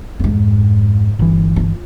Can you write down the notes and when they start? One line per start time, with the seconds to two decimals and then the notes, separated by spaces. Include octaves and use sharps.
0.19 F2 G#2
1.19 G1 E3
1.56 F4